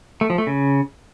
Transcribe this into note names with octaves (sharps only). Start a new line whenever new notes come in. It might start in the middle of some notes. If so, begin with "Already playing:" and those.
A3
F3
A3
C#3